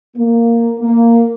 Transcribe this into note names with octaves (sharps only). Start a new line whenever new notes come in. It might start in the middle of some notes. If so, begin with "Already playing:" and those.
A#3
A#3